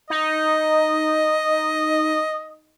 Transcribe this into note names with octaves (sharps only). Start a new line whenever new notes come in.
D#4 D#5